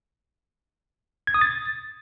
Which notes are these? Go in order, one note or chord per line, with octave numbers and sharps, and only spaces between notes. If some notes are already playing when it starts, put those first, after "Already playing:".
G#6
D#6
A6